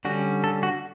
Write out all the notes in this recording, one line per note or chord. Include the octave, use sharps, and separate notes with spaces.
D3 G3 C#4 F#4
A4
F#4